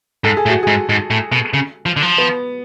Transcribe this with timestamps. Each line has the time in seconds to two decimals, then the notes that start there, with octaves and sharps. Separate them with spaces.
0.24 G#2 A4
0.37 G#4
0.46 A2
0.50 F#4
0.63 G#2 G#4
0.89 G#2
1.10 A2
1.32 B2
1.54 C#3
1.86 F3
1.97 D3
2.02 F3
2.18 B3